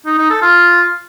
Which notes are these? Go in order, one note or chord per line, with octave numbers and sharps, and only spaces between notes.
D#4
D#4
A4
F4